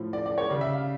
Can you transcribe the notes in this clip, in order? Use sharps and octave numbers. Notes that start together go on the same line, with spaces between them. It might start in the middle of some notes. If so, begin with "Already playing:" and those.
Already playing: A2 F3
D5
D5
C#5
C#3 G3 D5
E5
F5